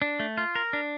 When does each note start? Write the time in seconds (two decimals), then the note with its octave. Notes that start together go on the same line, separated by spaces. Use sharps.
0.02 D4
0.20 A3
0.38 F4
0.56 A#4
0.73 D4